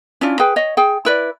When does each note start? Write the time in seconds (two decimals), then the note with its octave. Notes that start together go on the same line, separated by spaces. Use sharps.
0.21 C#4 D4 E4 F4
0.40 G#4 B4 G5
0.56 C#5 D#5
0.77 G#4 G5
1.05 E4 B4 D5